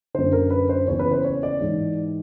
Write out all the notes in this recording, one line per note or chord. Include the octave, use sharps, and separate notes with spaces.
F#2 D3 C5
A#4
B4
C5
E2 C#3 E3 C#5
B4
C5
C#5
D5
G#2 E3